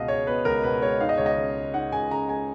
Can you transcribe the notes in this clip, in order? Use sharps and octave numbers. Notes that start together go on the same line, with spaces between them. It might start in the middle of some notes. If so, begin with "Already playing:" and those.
Already playing: C#2 B2 B3 D#5 F5
G#3 C#5
B3 B4
C#2 A#4
B2 B4
G#3 C#5
D#4 F5
D#5
C#2 C#5
D#5
C#3
G#3
D#4 F#5
C#2 G#5
C#3 A#5
G#3 G#5